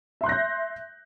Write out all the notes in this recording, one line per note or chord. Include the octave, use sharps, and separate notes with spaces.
E5 C6 F#6 G6 A#6